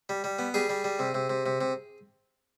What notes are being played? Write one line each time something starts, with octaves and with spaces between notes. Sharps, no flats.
G3
G3
B3
G3 G#4
G3
G3
C3
C3
C3
C3
C3